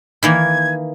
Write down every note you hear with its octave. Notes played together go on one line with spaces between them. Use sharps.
D#3 E3 A#3 G#6